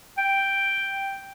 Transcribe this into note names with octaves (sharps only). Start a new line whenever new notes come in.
G5